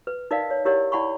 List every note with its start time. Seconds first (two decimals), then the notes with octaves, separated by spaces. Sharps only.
0.07 B4
0.31 D#4 A#4 D5 D#5 F5
0.51 C#5
0.65 E4 G4 A#4 C#5 D#5 F#5
0.92 E4 D5 F#5 G#5 B5 C#6